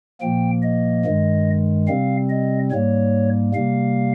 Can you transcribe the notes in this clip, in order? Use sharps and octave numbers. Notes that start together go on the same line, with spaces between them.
A#2 F3 A#3 G5
D#5
G2 D#3 G#3
C3 G3 C4 F5
D#5
G#2 G3 A#3 C#5
C3 G3 A#3 F5